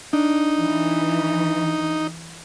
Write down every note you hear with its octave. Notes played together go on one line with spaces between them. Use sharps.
D4 D#4
E3